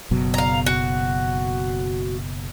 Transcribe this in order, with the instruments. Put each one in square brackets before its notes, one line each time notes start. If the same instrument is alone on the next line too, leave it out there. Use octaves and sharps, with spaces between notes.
[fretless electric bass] F#1 B2 F#3
[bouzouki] F5 A#5
F#4